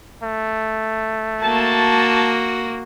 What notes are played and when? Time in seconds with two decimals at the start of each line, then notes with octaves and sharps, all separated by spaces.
0.23 A3
1.43 A#3 F#4 A5